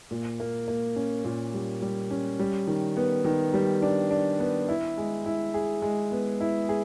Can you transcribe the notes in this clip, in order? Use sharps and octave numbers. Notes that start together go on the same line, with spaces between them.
A#2
A#3
A#3
C#4
A#2
G3
G3
C#4
G3
D#3
B3
D#3
G3
D4
D4
B3
E4
G#3
E4
G#4
G#3
B3
E4
G#4